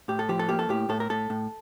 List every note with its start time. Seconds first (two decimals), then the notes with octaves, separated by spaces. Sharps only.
0.08 A2 G4
0.19 A4
0.29 F3 G4
0.39 A4
0.49 A#3 G4
0.59 A4
0.69 A2 G4
0.89 A2 A4
1.00 A#4
1.10 A2 A4
1.30 A2